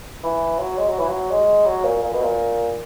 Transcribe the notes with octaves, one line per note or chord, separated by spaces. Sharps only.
E3
F#3
G#3
F#3
E3
F#3
G#3
F#3
A#2
A#2
B2
A#2